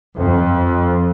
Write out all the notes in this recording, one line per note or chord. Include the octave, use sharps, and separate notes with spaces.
F2